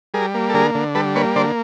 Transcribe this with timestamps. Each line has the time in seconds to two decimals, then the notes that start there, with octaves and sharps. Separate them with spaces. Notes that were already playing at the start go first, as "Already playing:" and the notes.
0.14 G3 G#4 A#4
0.34 A#3
0.49 A4
0.54 D3 G#4 A#4
0.75 D3
0.95 G3 A4 B4
1.15 A#3 B4 C#5
1.36 D3 C5 D5